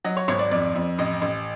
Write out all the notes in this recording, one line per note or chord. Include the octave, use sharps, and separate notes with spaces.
F#3 D#5
C#5
G#1 C#5
D5
F2 D5
F2
A1 D#5
A1